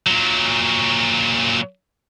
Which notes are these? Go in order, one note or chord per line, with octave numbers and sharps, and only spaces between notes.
A#2 F#3